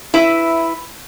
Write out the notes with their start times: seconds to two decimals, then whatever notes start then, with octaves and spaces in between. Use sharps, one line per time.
0.14 E4 B4 E5